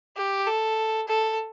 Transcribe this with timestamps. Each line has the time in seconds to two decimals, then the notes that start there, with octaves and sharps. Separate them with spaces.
0.17 G4
0.46 A4
1.08 A4